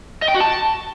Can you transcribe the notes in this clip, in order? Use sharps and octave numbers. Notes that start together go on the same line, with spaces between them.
D#5
G5
F#4
A5